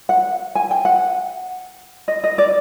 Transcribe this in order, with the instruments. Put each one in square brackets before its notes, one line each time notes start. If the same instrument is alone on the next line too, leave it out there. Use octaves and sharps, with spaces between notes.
[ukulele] F#5
G#5
G5
F#5
D#5
D#5
D5